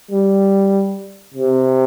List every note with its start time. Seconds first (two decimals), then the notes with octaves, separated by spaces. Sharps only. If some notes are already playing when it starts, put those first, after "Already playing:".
0.11 G3
1.34 C3